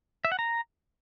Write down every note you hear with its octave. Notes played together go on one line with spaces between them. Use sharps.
E5
F#5
A#5